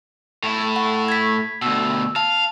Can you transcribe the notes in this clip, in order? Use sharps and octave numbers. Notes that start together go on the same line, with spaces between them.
A2 E4
F#5
G#6 B6
D2 B2 E6
F5 A5